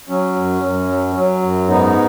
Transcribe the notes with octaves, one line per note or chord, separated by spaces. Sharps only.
F#3 C#4
F#2
F#2
F#3
F#3
F#2
G#2 B3 D#4